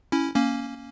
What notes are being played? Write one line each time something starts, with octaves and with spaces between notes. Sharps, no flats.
C#4 E4
A#3 C#4